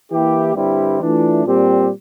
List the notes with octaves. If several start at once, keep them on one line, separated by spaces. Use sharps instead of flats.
E3 A#3 E4 G4
G2 D3 G3 C4 E4
E3 A3 D4 F4
A#2 G3 C4 G4